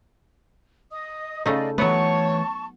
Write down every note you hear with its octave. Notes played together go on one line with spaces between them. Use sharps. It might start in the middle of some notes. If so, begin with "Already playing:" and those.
D#5 D#6
C#3 A3 D#4 D5 D#5 F5
E3 F#3 A3 B3 C#5 A5 C#6